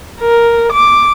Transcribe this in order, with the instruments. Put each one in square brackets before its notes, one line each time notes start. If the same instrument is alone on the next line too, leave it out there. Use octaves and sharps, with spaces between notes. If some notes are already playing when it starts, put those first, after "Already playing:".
[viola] A#4
D6